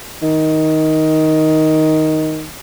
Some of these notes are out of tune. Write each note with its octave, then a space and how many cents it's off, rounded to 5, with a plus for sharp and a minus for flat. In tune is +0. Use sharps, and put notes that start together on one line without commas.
D#3 +10